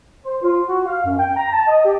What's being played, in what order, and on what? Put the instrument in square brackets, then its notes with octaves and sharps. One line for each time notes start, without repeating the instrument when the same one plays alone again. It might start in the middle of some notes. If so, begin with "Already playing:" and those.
[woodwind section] C5
F4
F#4
F5
F#2
G5
A#5
A5
D#5
G4